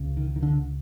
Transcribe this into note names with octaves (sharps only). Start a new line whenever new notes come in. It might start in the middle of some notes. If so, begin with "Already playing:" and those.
Already playing: C#2 C#3
D#3
D#3
D3